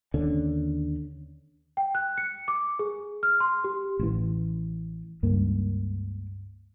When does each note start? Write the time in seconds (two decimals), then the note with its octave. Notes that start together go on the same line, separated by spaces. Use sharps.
0.14 D#2 D3 C#4
1.77 G5
1.95 F#6
2.18 C#7
2.48 D6
2.79 G#4
3.23 F6
3.40 C6
3.64 G4
3.99 A1 E3
5.23 C#2 G2 A#3